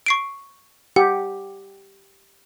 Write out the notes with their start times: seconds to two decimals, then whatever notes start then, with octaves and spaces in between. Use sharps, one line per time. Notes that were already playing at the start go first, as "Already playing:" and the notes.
0.06 C#6 C7 D7
0.96 G4 F#5